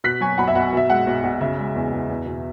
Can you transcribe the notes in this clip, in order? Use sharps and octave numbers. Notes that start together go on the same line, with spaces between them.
B2 F#6 B6
F#3 G#5 C#6
B1 F#5 B5
E5
B1 F#5
B2 E5
G#3 F#5
B1
B1 F#5
C#3 E5
G#3
E2
E2
E2
B2